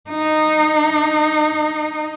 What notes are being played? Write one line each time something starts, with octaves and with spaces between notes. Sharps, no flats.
D#4